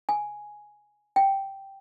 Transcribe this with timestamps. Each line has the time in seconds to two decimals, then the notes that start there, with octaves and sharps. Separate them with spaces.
0.09 G#5
1.16 G5